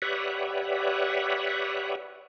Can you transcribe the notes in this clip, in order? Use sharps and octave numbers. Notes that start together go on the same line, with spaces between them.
G4 B4 C#5 D5 E5 F#5